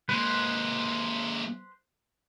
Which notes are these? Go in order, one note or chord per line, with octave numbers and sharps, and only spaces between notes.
G#3 A#3 B4 C5